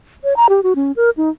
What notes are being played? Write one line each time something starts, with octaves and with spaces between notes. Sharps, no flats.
C#5
A#5
G4
F#4
C#4
A#4
D#4